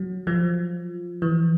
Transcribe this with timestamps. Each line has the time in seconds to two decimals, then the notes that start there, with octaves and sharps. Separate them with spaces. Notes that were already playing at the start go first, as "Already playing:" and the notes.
Already playing: F#3
0.27 F3
1.22 E3